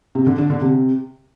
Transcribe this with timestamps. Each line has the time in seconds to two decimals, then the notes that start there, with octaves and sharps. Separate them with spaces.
0.15 C3
0.27 D3
0.38 D4
0.50 D3
0.61 C3